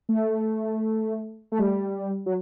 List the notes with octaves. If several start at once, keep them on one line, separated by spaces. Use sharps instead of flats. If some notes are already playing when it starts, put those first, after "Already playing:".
A3
A3
G3
F#3